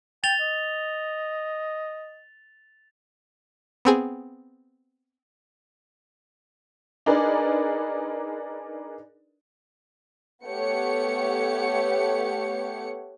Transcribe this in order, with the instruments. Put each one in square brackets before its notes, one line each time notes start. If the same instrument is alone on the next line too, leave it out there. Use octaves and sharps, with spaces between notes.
[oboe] G5 [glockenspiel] A6 F7 G7
[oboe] D#5
[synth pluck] B3 C4 G#4
[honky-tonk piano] D4 D#4 G#4 A#4 B4 D5
[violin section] A3 B3 G4 C#5 F#5 C#7